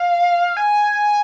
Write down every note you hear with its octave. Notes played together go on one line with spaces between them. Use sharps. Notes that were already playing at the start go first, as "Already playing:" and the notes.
Already playing: F5
G#5